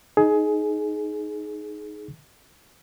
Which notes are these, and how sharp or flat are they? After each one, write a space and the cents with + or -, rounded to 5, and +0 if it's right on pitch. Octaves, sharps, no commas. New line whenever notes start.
D#4 +0 G#4 +20